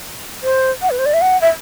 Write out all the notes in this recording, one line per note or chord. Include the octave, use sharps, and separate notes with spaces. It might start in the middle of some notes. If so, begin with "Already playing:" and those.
C5
F#5
B4
C5
D5
E5
F#5
E5